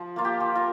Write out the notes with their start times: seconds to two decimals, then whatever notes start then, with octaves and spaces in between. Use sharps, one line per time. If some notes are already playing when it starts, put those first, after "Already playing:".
Already playing: F3
0.16 A#3 F4
0.25 G4
0.40 F3
0.55 F4 A#4